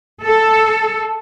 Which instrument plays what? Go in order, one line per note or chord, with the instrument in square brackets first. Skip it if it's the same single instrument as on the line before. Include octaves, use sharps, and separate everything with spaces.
[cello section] A4